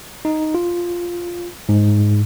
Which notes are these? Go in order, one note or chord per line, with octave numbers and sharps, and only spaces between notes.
D#4
F4
G#2